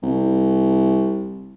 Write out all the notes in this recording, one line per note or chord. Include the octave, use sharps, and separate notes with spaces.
C2